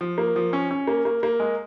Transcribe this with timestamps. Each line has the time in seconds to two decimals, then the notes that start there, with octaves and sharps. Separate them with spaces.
0.01 F3
0.18 A#3
0.36 F3
0.53 C#4
0.71 C#4
0.87 A#3
1.05 A#3
1.23 A#3
1.40 G#3